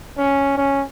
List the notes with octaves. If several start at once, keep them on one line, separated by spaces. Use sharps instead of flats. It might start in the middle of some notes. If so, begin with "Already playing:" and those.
C#4
C#4